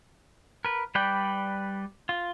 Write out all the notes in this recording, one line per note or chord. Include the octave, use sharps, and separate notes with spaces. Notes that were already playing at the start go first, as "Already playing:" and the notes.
A#4 B4
G3 B4 D5 G5
F4